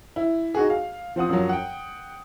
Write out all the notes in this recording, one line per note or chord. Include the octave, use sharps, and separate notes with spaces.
E4
D#4 F#4 G#4
F5
F3 C4 F#5 D#6
F#2 F3 F#3
F#5 G5